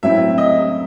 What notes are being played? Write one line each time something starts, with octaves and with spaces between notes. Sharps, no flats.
A2 F#3 C4 E4 E5
D#5